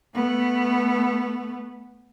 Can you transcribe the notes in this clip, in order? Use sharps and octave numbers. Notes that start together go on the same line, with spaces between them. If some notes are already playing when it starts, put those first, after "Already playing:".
A3 B3